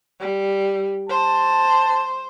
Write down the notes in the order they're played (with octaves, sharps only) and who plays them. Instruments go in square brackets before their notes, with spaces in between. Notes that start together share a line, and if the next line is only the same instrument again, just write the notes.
[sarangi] G3
[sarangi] C5 [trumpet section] A5